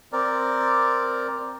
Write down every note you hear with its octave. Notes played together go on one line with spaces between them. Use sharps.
C4 A#4 D5